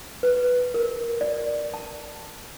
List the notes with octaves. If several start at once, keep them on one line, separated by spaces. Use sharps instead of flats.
B4
A#4
D5
A5